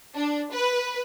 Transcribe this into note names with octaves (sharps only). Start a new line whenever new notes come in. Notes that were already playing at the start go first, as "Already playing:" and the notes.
D4
B4